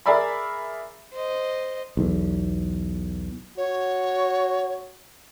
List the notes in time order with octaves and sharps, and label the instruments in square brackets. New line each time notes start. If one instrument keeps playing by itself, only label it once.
[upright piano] G#4 A#4 D5 E5 B5
[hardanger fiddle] C5 D#5
[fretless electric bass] B1 E2
[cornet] F#4 [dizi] C#5